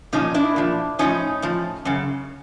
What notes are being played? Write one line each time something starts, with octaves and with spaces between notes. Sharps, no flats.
A#2 F3 C#4 D#4
D4 E4
A#2 F3
A2 F3 C#4 D#4
A2 F3
F#2 C#3